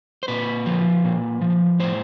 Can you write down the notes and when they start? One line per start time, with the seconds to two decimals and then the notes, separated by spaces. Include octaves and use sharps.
0.23 C5
0.28 A#2 B4
0.66 F3
1.04 A#2
1.41 F3
1.80 A2 C5